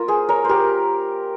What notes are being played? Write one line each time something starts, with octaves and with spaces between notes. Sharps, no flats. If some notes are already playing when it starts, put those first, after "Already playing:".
Already playing: A#3 F4 A#4
G#4 C5
A#4 C#5
G4 A#4 C5